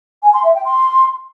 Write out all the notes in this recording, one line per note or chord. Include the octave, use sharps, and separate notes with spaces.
G#5
C6
E5
G5
C6